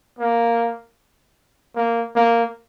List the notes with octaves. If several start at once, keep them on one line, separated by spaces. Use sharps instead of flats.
A#3
A#3
A#3